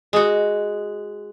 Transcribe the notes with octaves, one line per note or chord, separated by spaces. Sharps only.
G#3 F#4